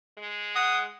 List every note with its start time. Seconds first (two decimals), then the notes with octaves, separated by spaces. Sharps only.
0.18 G#3
0.56 F#5 D#6